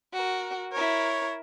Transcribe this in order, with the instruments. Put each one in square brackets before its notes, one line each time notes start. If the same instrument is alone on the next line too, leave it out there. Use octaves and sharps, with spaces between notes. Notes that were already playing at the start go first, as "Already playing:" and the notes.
[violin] F#4 A#4
[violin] E4 A#4 [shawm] C#5